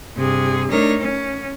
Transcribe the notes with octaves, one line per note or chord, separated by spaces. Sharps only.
G2 C3 G#4
A3 D4 D#4 A#4 C#5 A#6
C#4